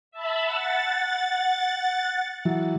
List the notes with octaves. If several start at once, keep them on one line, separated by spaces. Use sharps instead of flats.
E5 A5 B5
F#5 A6
E3 F#3